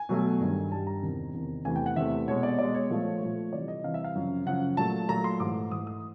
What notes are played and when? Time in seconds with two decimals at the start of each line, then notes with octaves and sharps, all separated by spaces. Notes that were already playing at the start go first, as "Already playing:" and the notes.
Already playing: G#5
0.09 B2 F#3 A3
0.41 G2 D#3 G3
0.71 G2 D#3 G3 A5
0.87 A#5
1.02 E2 C3 D#3
1.34 E2 C3 D#3
1.65 E2 C3 E3 A3 G#5
1.76 G5
1.86 F#5
1.96 E2 C3 E3 A3 E5
2.28 B2 G#3 C#5
2.43 D5
2.59 B2 G#3 D5
2.74 C#5
2.90 A#2 F3 A3
3.21 A#2 F3 A3
3.53 C3 E3 G3 D5
3.68 D#5
3.84 C3 E3 G3 F5
3.94 E5
4.04 F5
4.15 F#2 C#3 F3
4.46 F#2 C#3 F3 F#5
4.77 A#2 F#3 A3 A5
5.08 A#2 F#3 A3 A#5
5.24 C6
5.40 G#2 E3 A3 D6
5.71 G#2 E3 A3 D#6
5.87 D#6